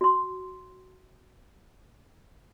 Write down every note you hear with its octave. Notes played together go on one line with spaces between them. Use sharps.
F#4 C6